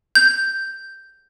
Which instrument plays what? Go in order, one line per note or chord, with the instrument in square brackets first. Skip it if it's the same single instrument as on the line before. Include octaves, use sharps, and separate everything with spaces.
[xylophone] G6